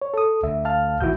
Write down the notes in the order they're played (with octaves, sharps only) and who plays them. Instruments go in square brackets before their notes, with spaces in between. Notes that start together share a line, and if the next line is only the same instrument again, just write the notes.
[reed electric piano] C#5
A4 D#6
[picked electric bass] D2 [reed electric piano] E5
[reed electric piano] F5 A5 F6
[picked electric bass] A1 D#3 [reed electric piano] E4 F#4 G6